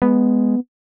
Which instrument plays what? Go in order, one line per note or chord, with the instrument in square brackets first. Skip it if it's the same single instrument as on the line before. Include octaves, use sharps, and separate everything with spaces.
[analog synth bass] G#3 [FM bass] B3